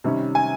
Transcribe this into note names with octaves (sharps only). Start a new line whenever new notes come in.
C3 D#3 G3 C#4
G#5